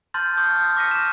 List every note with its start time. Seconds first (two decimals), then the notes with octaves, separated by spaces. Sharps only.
0.14 A5 C6 F6 G6 A6
0.37 C#6 D#6 G6
0.77 D6 F6 A#6 B6 C#7 D#7
0.91 E7